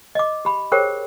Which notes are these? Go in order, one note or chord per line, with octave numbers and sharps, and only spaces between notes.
D#5 D6
G4 B5
G4 G#4 A#4 C5 C#5 G5